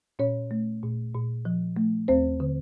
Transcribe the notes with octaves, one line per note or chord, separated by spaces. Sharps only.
A#2 C#4 C#5
A3
A#2
A#2
F3
A3
D#2 C4 C5
D3